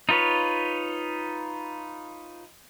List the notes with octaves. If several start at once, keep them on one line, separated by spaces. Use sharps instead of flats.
D#4 F4 B4 C#5